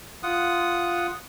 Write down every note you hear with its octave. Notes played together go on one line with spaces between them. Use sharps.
F4 F#5 D#6